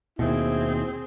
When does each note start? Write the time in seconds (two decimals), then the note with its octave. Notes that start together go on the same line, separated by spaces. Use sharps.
0.19 D#2 B2 C4 E4 G#4